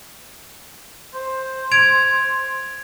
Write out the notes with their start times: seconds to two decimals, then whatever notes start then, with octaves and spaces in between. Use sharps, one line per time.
1.14 C5
1.71 G#6 D7 F7